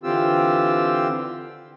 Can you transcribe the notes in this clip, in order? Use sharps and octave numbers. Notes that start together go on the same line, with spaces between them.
D3 E3 C4 F4 G4 E6